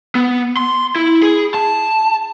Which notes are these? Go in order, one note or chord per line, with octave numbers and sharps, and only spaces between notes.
B3
C6
E4
G#4
A5